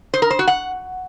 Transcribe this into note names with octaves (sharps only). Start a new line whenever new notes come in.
C5
A#4
C5
F#4
F#5